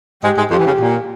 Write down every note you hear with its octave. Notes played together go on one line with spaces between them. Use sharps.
G#2 G#3 G4
G#2 G#3
F2 F3 G4
E3
C#3
A#2